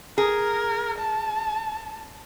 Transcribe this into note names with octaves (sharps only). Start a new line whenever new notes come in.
G#4 A#4
A5